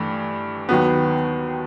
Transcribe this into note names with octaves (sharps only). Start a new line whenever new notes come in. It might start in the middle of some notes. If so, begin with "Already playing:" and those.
Already playing: G2 E3 A3
D#2 D#3 F#3 B3